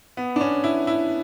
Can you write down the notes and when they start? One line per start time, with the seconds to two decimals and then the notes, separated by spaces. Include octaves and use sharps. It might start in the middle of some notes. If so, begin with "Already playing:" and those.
0.17 B3
0.36 D4
0.41 C#4
0.64 E4
0.87 E4